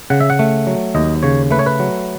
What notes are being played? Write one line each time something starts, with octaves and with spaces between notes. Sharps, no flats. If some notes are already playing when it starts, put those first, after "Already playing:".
C#3 F#5
E5
F#5
A3
F#3
D#2 D#5
C#3 C#5
A3 B4
C#5
B4
F#3